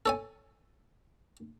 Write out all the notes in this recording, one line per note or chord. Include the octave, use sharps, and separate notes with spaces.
A4 C#5 G#5